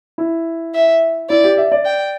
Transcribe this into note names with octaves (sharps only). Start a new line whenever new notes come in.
E4
E5
E4 D5
G4
E5
D5
G5